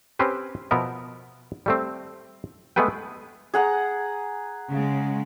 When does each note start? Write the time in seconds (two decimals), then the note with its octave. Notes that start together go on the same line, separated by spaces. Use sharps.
0.19 C4 C#4 G4 B4 C5
0.71 B2 F3 B3 A#4 E5
1.66 G3 A3 C4
2.76 G#3 A3 B3 G#4 B4 G5
3.54 G#4 F#5 A#5
4.72 C#3 G#3